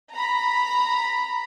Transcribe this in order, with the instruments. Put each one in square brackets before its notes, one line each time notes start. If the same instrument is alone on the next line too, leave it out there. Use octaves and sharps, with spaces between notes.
[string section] A#5 B5